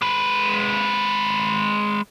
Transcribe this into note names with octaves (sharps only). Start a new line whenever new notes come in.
G#3 B4